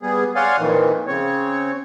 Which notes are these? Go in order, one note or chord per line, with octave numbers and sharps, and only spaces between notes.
G3 B3 G#4
C#5 D5 F5 F#5 G#5 C6
F2 A#2 D#3 E3
C#3 C4 C#5